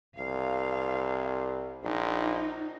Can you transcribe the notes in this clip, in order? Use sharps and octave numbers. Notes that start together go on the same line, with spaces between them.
C2 F5
A#1 D#4